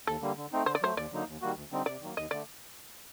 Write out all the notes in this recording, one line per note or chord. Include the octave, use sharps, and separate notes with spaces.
D#2 A4
D3 G3 A#3
D3
A3 C4 D#4
D3 C5
D5
F#3 A3 C5
D#2 D5
D3 F#3 A#3 D#4
D#2
D#3 G3 A#3 F#4
D2
D3 G3 C4 D#4
C3 D5
D#3 F#3 A#3
D#2 D#5
D3 A3 D5